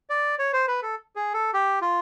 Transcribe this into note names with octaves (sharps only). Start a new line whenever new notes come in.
D5
C#5
C5
B4
A4
G#4
A4
G4
F4